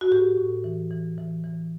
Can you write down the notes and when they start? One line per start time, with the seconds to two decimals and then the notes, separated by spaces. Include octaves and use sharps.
0.01 F#4
0.11 A2 G4
0.37 A2
0.64 E3
0.91 E3
1.18 E3
1.44 E3